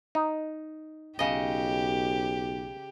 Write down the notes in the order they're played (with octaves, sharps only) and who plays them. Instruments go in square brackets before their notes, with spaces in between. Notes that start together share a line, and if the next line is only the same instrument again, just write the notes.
[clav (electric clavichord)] D#4
[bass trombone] B1 [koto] C#3 D#5 [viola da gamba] G4